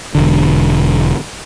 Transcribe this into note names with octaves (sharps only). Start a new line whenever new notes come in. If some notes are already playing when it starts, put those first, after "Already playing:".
E1 D3